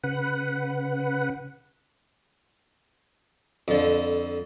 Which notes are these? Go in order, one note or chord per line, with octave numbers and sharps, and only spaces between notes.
C#3 B4 F#5
F2 D3